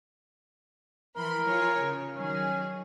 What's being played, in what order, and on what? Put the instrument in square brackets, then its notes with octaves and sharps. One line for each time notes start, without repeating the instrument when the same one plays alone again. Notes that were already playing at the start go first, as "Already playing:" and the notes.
[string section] E3 B5 C6 [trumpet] A#4
[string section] F4 G#4 C#5
C#3
[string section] D#3 F#3 G#4 [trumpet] C#4